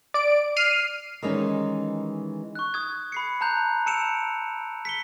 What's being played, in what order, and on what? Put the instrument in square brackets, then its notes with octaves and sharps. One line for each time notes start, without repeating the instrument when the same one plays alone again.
[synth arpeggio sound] D5 D7
F6 C7 D#7
[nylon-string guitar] D#3 E3 G3 G#3 C#4 D#4
[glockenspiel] C#6 F#6
D#6 G#6
B5 C7 C#7
A5 A#5 F#6 G6 F7
A5 E6 C#7 D7 E7 F7
B6 C#7 G7